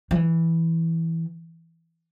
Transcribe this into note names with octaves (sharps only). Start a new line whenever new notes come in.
F3
E3